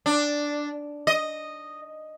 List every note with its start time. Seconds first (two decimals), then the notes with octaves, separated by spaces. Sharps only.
0.06 D4
1.07 D#5